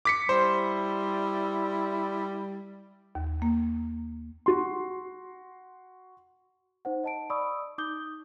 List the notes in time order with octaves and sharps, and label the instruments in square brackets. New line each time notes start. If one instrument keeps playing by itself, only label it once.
[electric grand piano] D6 B6 C#7
[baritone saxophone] G3 [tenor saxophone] E4 [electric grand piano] C5
[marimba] D#2
A#3
[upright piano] F#4 C6
[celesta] D#4 C5 F#5
D#5 A5 D7
D5 B5 C#6 D#6 E6
D#4 D6 D#6 G6 G7